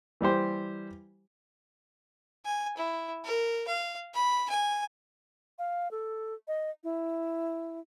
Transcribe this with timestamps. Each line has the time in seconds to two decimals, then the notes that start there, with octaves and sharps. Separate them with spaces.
0.21 E3 G3 G4 C5
2.45 G#5
2.77 E4
3.25 A#4
3.68 F5
4.14 B5
4.50 G#5
5.59 F5
5.91 A4
6.48 D#5
6.84 E4